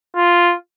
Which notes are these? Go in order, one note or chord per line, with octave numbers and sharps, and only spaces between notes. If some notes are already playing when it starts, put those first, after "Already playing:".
F4